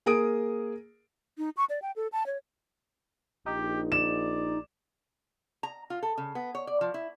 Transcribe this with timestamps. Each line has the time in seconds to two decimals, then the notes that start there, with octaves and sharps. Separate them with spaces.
0.06 A#3 G#4 A#4 D#6 D7
1.38 D#4
1.57 C#6
1.70 D5
1.82 G5
1.96 A4
2.12 A5
2.26 C#5
3.46 A#1 D#4 G4
3.92 D5 E7
5.63 A#5
5.90 F4
6.03 A4
6.18 C#3
6.35 B3
6.55 C#5
6.67 D5
6.81 F3
6.94 E4